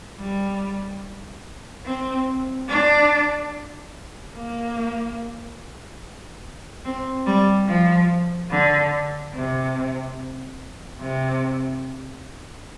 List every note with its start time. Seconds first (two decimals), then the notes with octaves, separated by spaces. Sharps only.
0.19 G3
1.85 C4
2.69 D4
4.35 A#3
6.85 C4
7.27 G3
7.68 F3
8.51 D3
9.35 C3
11.01 C3